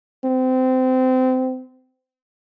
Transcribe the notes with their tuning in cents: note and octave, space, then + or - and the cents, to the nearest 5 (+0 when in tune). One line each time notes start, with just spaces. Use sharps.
C4 -25